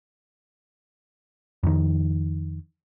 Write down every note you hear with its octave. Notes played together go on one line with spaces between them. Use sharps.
F2 D#3